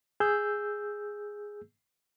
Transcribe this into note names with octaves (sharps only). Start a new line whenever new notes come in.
G#4 E6 G6